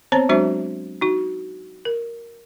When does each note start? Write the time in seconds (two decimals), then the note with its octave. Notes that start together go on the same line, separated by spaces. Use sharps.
0.12 B3 C4 C5 C#5 A5 A#5
0.29 F#3 G#3 D4 F#4 C5 E5
1.01 D#4 F#4
1.85 A#4